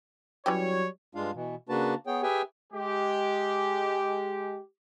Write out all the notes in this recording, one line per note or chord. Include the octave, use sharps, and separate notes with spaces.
E3 F#3 G3 C#4 G4 C#5
G2 G#3 D4 F4 F5
B2 E3
C#3 A#3 D4 F#4 B4 A5
B3 G#4 C#5 G5
G4 G#4 B4 E5 G5 G#5
G#3 G4